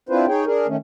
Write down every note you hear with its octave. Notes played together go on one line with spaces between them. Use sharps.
C4 D4 E4 F4 B4 C5
D#4 G#4 C#5 G5
D4 G#4 A#4
D#3 A3 C#4